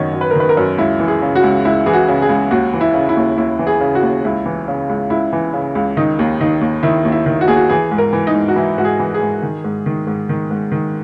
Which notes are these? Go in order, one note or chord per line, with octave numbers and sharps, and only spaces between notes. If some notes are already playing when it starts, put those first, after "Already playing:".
Already playing: F#2 D#3 C#5 D#5 F#5
F#2
B4
A#4
D#3 B4
A#4
F#2
C#2 E4
E3
G#4
C#3
F#4
C#2
C#2 E4
E3 G#4
F#4
C#3
G#4
C#2
D#2 F#4
E3
E4
C#3
E4
D#2
D#2 E4
E3
G#4
C#3
F#4
D#2
C#2 E4
E3
C#3
C#2
C#2 E4
E3
C#3
C#2
D#3 D#4
D#2
D#3 D#4
D#2
D#3 E4
D#2
E4
D#3
F#4
D#2 G#4
F#4
E3 G#4
G#2
A#4
E3
D#4
G#2
F#4
E3 E4
G#2 F#4
G#4
E3
G#4
G#2
D#3
G#2
D#3
G#2
D#3
G#2
D#3